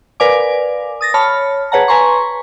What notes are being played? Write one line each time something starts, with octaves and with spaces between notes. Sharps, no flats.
A#4 B4 D5 F5 G#5 D6
D#6 A6 A#6
C#5 A5 B5 F6
G#4 B4 C#5 F#5 A5 A#5
B4 G#5 A#5 C6 C#6